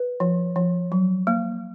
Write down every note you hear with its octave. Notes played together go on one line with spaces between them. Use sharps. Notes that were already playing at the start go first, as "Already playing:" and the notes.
Already playing: B4
F3
F3
F#3
A#3